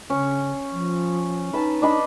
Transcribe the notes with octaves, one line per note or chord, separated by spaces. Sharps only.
C#3 C#4
F3
D#4 B4 A5
D4 D#5 B5